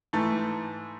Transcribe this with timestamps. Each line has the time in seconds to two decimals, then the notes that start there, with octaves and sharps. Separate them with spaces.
0.13 G#2 E3 A3